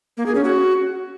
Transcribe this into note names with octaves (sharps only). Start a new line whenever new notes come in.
A#3
G#4
C#4
F#4